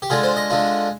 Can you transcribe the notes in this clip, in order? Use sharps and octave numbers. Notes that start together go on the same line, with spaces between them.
G4
D3 G#3 D4 F4 G#4
C5
D#5
D3 G#3 D4 F4